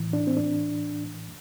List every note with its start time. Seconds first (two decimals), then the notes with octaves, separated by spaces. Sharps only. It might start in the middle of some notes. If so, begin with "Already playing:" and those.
Already playing: A2 E3
0.13 D4
0.27 C4
0.37 D4